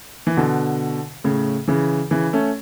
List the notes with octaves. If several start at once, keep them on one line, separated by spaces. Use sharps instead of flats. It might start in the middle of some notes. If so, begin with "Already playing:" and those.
E3
B2 D3
A2 C#3
C#3 E3
C#3 E3
A3 C#4